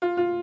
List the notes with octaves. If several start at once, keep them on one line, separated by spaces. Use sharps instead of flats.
F4
F4